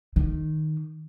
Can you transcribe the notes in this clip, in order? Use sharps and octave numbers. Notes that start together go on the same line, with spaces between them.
D#3